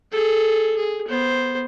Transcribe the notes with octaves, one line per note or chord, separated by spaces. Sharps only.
G#4 A4
G#4
B3 C5